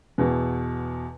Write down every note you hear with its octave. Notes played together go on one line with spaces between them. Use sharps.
E2 B2